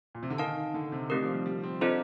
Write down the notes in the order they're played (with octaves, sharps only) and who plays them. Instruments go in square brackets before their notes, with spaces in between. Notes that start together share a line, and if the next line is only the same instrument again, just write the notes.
[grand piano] A#2
C3
D3
[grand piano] D#3 [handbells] D#4 A#4 F5 A5
[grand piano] D3
C3
[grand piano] D#3 [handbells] A3 C4 G4 A#4
[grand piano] F3
G3
G3
C4
[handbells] C4 F4 A4 C5 D#5 [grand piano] D4